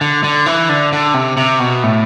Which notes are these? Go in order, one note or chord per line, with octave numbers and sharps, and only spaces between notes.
D3
D3
E3
D3
D3
C3
C3
B2
A2